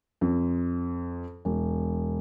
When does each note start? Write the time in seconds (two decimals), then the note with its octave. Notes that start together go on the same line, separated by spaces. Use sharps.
0.21 F2
1.45 E1